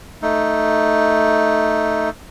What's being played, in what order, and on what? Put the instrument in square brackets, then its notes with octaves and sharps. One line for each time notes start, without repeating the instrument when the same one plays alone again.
[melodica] A3 D#4